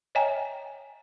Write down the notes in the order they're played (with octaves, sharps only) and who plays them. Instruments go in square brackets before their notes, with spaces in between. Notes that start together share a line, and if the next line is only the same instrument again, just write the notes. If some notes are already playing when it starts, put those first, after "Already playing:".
[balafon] C#5 D#5 E5 G5 G#5 A#5